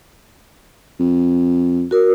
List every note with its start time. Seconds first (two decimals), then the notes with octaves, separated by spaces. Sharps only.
1.00 F2
1.91 F#4 A#4